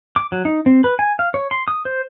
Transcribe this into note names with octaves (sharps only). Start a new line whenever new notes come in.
D6
F#3
D#4
C4
B4
G#5
F5
C#5
C6
D#6
C5